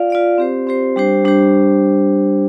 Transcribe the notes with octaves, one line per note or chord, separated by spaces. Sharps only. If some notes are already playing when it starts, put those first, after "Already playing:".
Already playing: F4 D5 F5
F4 D5 F5
C4 G4 C5
C4 G4 C5
G3 D4 G4 C5
G3 D4 G4 C5